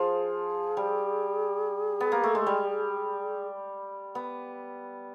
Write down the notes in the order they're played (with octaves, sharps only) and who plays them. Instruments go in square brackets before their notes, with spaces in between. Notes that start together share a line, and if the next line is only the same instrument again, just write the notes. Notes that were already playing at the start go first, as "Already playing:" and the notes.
Already playing: [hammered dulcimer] F3 [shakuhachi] G#4
[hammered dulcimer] G3
B3
A#3
A3
G#3
G3
B3